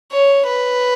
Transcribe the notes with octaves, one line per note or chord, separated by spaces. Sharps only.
C#5
B4